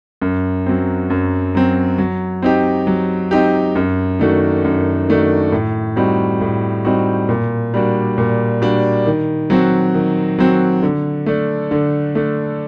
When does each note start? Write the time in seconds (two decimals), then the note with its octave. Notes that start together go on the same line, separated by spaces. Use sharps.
0.22 F#2
0.66 F#3 C4
1.10 F#2
1.55 F#3 C4
1.98 F#3
2.42 C4 D#4 G4
2.87 F#3
3.31 C4 D#4 G4
3.75 F#2
4.19 D#3 A3 D4 F#4
4.64 F#2
5.09 D#3 A3 D4 F#4
5.52 A2
5.96 G3 C4 D#4 F#4
6.41 A2
6.85 G3 C4 D#4 F#4
7.29 A#2
7.74 G3 A#3 D4 F#4
8.18 A#2
8.62 G3 A#3 D4 F#4
9.06 D#3
9.50 F#3 C4 F#4
9.94 D#3
10.39 F#3 C4 F#4
10.83 D3
11.26 A3 D4
11.71 D3
12.15 A3 D4